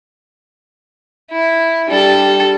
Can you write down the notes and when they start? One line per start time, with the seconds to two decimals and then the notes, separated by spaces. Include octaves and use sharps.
1.31 E4
1.90 G3 D4 A4